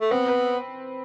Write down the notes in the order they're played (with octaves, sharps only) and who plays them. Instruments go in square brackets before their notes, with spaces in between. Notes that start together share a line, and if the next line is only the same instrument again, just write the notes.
[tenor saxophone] A3
[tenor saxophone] B3 [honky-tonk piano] C4
[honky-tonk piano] B4